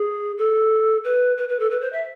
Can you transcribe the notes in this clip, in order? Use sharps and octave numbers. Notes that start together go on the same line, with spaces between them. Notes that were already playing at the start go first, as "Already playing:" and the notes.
Already playing: G#4
A4
B4
B4
B4
A4
B4
C5
E5